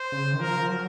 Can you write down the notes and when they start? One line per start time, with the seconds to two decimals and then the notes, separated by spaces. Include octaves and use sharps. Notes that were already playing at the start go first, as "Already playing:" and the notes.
Already playing: C5
0.12 C#3
0.33 D#3
0.40 F3 A#4
0.70 F#3